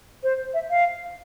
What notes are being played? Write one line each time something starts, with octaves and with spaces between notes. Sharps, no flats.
C5
E5
F5